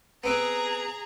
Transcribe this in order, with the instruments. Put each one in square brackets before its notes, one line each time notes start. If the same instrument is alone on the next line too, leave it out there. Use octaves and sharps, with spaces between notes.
[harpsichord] B3 C4 B4 [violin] G#4 A#5